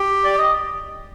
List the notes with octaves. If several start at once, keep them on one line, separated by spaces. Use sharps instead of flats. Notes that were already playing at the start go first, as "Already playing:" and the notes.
Already playing: G4
D5
D#5